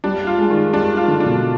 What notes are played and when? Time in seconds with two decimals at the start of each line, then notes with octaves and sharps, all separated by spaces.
0.04 G3 D4
0.27 F4
0.38 G#3
0.50 D#3
0.73 G3 D4
0.97 F4
1.08 D3
1.20 D4
1.26 B2